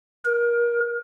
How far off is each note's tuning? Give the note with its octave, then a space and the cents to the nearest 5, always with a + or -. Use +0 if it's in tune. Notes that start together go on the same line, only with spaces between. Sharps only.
A#4 +30